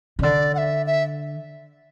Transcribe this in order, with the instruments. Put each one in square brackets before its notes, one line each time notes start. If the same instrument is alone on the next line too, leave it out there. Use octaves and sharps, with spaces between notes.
[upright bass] C#3
[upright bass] D3 [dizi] D5
[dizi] F#5
E5
E5